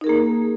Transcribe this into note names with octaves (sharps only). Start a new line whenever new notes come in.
A#3 D#4 G#4 A#4